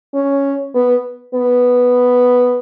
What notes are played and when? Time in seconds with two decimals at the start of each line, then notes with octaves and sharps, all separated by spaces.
0.14 C#4
0.75 B3
1.35 B3